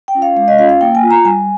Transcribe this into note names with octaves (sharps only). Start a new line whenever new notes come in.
G5
C#4 F4
F5
G#3 F5
D#5
C#4 F4 F5
F5
A#3 G5
G#5
F4
A#5
G3 G#5